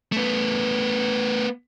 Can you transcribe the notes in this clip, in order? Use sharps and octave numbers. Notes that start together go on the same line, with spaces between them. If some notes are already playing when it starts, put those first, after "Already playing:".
A3 B3